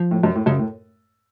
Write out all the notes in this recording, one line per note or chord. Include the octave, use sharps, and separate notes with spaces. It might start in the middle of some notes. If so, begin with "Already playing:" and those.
Already playing: F3
A2
F#2
A2
F#2 C#3
A2